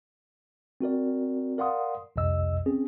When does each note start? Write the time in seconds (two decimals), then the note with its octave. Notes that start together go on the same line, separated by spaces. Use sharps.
0.81 C4 F#4 A#4 D5
1.58 A#4 D5 F5 F#5 C6 D#6
2.16 C2 F2 C3 D#5 E6
2.66 C4 C#4 G#4